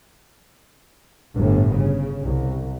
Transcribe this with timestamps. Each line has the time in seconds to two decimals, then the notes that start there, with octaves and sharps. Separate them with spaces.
1.36 G1 A2
1.77 C#3
2.24 C2